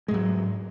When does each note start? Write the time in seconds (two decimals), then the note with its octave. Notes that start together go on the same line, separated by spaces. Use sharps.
0.08 G#3
0.11 G#2
0.14 F#3